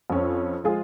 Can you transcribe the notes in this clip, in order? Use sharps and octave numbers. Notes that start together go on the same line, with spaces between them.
F2 F3 C#4
F3 G#3 F4 G#4